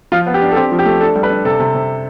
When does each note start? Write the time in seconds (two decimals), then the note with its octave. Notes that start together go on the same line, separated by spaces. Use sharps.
0.12 F3 F4
0.26 B3
0.34 G4
0.42 D4
0.52 A4
0.56 C4 G4
0.72 F3
0.79 G4
0.85 A3
1.00 D4 A4
1.16 G3
1.23 B4
1.30 D4
1.45 C3 A4
1.59 C3
1.75 C3